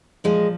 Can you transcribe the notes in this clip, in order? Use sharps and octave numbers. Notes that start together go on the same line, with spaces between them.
A#2 F3 G#3